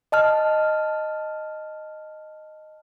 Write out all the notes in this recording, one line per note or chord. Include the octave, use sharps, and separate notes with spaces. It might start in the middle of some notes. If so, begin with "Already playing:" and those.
D#5 A5 F6